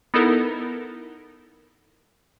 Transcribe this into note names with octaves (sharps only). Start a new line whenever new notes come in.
B3 D#4 E4 A4 A#4